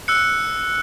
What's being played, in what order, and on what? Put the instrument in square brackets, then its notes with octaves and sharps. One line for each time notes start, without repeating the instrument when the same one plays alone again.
[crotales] E6 F#6 C#7